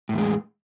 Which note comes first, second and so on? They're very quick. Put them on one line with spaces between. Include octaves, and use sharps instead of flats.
A2 E2 G#3